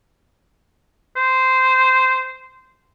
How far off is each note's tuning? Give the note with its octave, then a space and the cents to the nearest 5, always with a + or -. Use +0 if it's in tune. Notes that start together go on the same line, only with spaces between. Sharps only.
C5 -10